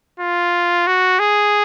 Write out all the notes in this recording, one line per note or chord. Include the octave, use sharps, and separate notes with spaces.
F4
F#4
G#4